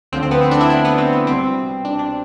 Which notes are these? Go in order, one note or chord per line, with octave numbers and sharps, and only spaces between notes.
D2 D3 F3 C4
C4
B3
C4
D4
E4
D4
B3
C4
B3
C2 B2 G3 C4
D4
D4